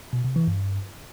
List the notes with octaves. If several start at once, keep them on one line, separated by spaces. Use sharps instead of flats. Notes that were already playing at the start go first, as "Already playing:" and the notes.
B2
C3
E3
G2